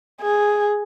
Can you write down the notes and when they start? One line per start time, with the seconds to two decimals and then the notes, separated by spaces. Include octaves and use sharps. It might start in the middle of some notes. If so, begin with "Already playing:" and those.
0.22 G#4